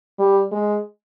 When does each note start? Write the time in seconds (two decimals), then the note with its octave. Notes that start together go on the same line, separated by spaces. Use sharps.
0.19 G3
0.52 G#3